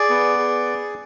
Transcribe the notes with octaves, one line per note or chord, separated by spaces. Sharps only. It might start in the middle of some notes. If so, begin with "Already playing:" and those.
Already playing: G#4 D5
B3
G#4